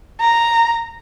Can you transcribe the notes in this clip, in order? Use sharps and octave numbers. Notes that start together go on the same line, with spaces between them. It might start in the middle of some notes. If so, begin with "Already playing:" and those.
A#5